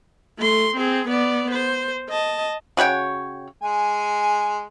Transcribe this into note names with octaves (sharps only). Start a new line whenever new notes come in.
A3 C6
C4 G#4
B3 D5
C5
D#5 A5
C#3 F#4 C#5 G5
G#3 G#5